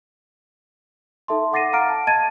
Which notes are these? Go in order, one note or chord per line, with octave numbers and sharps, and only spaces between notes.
D#4 A4 E5 A5 C6
F#5 D6 A6 A#6 C7 D#7
F5 F#5 A#5 D6 F6 D7
A5
D#5 A5 G#6 A6 D#7